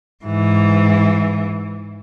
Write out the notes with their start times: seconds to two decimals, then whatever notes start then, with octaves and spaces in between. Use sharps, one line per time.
0.25 G#2 E3